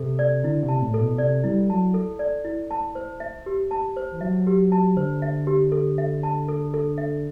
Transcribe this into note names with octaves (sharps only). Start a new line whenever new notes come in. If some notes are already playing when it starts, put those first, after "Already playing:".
Already playing: C3 A4
D5
D3 E4
C3
A5
A2
A4
B2
C3 D5
G3 E4
F#3 A5
A4
D5
E4
A5
C5
E5
G4
A5
C5
E3
F#3 E5
G4
A5
D3 C5
E5
G4
A4
E5
A5
A4
A4
E5